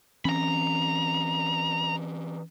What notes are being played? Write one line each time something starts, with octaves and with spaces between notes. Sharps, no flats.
E3 C4 C#4 A#5 B5